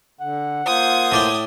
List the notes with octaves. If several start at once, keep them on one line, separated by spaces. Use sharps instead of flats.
D3 F#5
A#3 F4 C5 D#6 G#6
A2 D5 G5